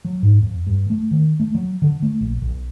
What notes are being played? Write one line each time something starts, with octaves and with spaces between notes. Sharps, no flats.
F#3
G#2
F2
G2
A3
D#3
A3
F#3
D3
A3
A#1
B1